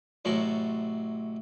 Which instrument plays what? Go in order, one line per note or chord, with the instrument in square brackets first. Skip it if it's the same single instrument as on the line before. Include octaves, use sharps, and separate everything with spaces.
[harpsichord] A1 C3 F#3 A#4 A5